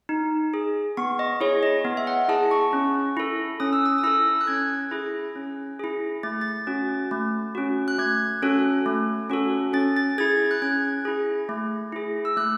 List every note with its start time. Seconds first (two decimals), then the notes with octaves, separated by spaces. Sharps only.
0.09 D#4
0.54 G#4
0.97 B3 C#6
1.19 D#5
1.41 E4 G#4 C#5
1.63 D#5
1.85 B3
1.97 E5
2.07 F#5
2.28 E4 G#4 A5
2.51 C#6
2.73 C#4
3.17 E4 A4
3.60 C#4 D#6
3.73 E6
3.86 D#6
3.98 D#6
4.03 E4 A4 E6
4.41 F#6
4.47 C#4 G#6
4.91 E4 G#4
5.35 C#4
5.80 E4 G#4
6.23 A3 A6
6.41 A6
6.67 C#4 F#4
7.11 A3
7.55 C#4 F#4
7.88 F#6
7.99 A3 G#6
8.42 C#4 F#4 A4
8.86 A3
9.30 C#4 F#4 A4
9.73 C#4 A6
9.96 A6
10.18 E4 G#4 G#6
10.51 F#6
10.62 C#4 G#6
11.05 E4 G#4
11.49 A3
11.92 E4 G#4
12.25 E6
12.37 A3 F#6